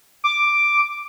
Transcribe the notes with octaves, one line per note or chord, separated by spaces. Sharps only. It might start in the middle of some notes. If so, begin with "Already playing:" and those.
D6